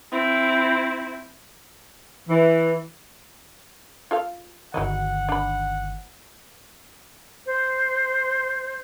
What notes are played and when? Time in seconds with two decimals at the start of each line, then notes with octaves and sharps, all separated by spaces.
0.12 C4 E4
2.29 E3
4.11 F4 A4 F5
4.74 G1 D#3 F#3 E4 D#5 F#5
5.29 D4 B5
7.46 C5